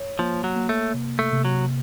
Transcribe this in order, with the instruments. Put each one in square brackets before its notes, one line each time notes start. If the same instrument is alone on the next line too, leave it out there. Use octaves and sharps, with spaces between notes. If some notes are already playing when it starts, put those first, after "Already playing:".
Already playing: [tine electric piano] C#5
[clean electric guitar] F3 [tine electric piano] A#3
[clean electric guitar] F#3
[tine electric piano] A#3
[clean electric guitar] A3
[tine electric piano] C3
[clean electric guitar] A3
[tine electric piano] C3
[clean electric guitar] F#3